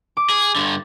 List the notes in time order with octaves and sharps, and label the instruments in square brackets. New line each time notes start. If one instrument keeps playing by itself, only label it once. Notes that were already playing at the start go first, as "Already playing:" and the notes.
[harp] D6
[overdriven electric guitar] G#4
G2 D3